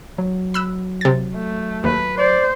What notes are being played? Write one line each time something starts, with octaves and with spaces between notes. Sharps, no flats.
F#3
B5 E6 F#6
C3 A6
A3
D#2 B4
C5 D5